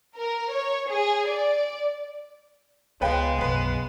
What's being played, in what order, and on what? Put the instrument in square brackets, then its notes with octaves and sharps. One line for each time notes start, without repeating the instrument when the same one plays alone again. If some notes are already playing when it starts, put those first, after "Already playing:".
[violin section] A#4
C#5
G#4
D5
[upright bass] C#2 [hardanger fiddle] G#3 [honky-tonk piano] B3 B4 G5 [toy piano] C#5 F5
[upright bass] B1 F#2 [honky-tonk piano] B3 B4